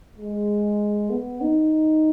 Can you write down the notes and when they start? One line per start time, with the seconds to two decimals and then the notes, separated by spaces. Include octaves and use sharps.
0.18 G#3
1.10 B3
1.41 D#4